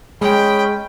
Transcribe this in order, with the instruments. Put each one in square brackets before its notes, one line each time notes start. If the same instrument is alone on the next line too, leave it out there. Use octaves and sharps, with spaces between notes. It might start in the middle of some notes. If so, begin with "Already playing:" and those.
[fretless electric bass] G#3 [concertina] C#4 G#4 B5 [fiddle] G5